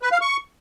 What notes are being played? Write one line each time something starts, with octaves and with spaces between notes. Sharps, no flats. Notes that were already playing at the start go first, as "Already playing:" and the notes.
B4
F5
C#6